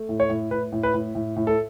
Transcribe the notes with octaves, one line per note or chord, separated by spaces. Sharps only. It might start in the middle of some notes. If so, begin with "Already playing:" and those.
Already playing: A3
A2
C#5
A2
A2 B4
A2
B4
A2
A2
A2
A4